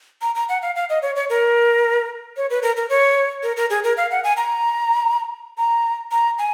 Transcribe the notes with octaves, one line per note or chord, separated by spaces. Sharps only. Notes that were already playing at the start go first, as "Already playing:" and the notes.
A#5
A#5
F#5
F5
F5
D#5
C#5
C#5
A#4
C#5
B4
A#4
A#4
C#5
A#4
A#4
G#4
A#4
F5
F#5
G#5
A#5
A#5
A#5
G#5